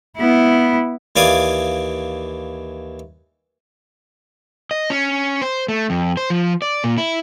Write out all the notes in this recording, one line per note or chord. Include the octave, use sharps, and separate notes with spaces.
B3 E4
D#2 E3 D5 F5 G#5 D#6
D#5
C#4
C5
A3
F2
C5
F3
D5
A#2
E4